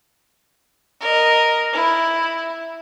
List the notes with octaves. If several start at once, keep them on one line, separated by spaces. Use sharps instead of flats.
A#4 D#5
E4